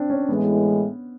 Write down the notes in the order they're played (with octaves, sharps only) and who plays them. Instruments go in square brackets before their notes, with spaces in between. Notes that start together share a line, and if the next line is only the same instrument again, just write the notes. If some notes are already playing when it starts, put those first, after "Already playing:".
Already playing: [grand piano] C4 D4
C#4
[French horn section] A2 E3 G#3 [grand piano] B3